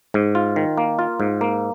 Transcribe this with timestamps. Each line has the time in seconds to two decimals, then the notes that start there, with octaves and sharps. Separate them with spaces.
0.14 G#2
0.35 F4
0.56 D#3
0.78 A#3
0.99 F4
1.20 G#2
1.41 A#3